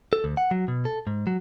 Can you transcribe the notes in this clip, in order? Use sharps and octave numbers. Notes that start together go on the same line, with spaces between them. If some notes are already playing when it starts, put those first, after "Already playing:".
A4
D2
F#5
F#3
B2
A4
G#2
F#3